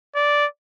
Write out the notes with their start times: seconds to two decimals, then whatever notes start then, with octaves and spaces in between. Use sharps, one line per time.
0.16 D5